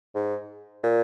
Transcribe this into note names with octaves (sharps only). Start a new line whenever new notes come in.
G#2
A#2